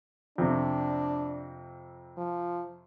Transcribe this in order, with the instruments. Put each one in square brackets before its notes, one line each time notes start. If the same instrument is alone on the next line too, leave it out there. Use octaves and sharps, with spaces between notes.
[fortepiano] F2 C3 [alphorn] D4
[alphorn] F3